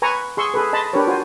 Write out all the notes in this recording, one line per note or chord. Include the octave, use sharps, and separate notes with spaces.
B4 G#5 A#5 B5 C#6
G#4 C6 C#6 E6
G#4 A4 B4
D#5 A5 B5 C6
D4 G4 A#4 B4 C#5
F4 F#4 C5 G#5